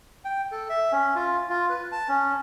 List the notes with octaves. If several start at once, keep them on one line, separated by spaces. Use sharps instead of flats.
G5
A4
E5
C#4
F4
F4
B4
A5
C#4